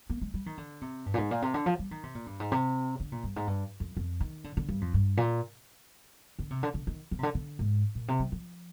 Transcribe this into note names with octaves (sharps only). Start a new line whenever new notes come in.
A#3
G#3
G3
D#3
D3
C3
G2
A#2
G#2
A#2
C3
D3
F3
G3
D#3
C3
A#2
G2
G#2
C3
D3
A#2
G2
G#2
G2
F2
F2
D#3
D3
D3
G2
F2
G2
A#2
D3
C3
D3
D3
D#3
F3
C3
D3
D3
G#2
A#2
C3
G3
F3